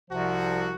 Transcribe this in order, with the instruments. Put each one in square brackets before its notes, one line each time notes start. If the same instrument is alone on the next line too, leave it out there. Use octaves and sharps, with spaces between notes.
[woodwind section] C2 C3 F3 [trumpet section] F#4